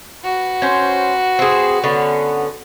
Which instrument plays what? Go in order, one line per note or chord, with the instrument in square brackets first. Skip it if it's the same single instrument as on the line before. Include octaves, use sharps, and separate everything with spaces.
[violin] F#4 B4
[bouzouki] C#4 C5
C4 G#4
D3 B3 C#4